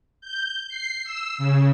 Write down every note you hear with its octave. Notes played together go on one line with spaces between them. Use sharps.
G6
C7
E6
C#3